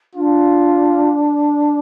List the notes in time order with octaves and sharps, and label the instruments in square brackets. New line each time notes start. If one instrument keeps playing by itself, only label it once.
[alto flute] D4 [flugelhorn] F4